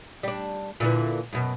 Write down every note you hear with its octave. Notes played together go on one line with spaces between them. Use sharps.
G3 D4
A#2 D3 E3
F#2 B2